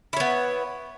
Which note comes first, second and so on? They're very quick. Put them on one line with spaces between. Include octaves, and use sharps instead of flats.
E4 C#5 B3